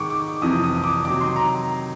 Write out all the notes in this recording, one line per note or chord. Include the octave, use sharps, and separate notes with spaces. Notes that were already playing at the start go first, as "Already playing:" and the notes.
Already playing: G#2 D#3 G#3 C#6 D6
D6
F2 C3 E3 D#6
D#6
D#6
D6
C3 D#3 F#3 D6
C6
A#5